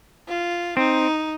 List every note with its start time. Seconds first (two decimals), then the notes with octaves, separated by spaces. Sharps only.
0.28 F4
0.77 C4 D#4